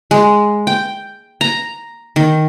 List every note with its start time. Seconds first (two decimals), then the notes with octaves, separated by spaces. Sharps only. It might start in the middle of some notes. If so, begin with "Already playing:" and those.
0.11 G#3
0.67 G5
1.41 A#5
2.16 D#3